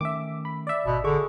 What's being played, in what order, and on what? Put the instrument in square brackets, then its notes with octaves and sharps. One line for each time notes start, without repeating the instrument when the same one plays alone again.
[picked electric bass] D#3 A3 C#4 [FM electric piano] E5 D6
[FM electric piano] B5
D5 E5
[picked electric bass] G#1 [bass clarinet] B2
[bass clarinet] D3 [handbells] G#4 C#6